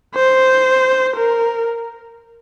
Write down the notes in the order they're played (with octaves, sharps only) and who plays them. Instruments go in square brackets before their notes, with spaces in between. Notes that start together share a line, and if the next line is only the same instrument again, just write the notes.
[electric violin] C5
A#4